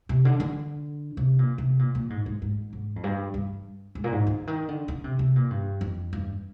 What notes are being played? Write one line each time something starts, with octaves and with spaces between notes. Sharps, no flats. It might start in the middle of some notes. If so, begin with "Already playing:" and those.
C3
D3
D3
C3
A#2
C3
A#2
A#2
G#2
G#2
G#2
G#2
F2
G2
G2
G#2
A#2
G#2
D3
D#3
D3
D3
C3
C3
A#2
G2
F2
G2